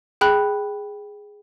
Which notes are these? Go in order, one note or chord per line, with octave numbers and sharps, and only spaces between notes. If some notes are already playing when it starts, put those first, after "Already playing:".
G#4 G5 B5 F#6